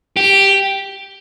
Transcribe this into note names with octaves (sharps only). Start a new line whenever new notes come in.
G4